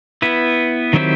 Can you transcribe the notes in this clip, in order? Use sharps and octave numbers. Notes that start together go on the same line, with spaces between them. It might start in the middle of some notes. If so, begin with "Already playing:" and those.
B3 E4 B4
D#3 F#3 C4 E4 G4